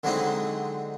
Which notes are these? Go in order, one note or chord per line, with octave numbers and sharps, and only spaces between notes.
D3 F#3 G#3 C4 D#4 E4